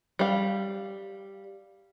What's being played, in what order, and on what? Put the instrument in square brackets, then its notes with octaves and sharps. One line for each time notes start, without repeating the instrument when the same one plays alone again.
[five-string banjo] G3 F5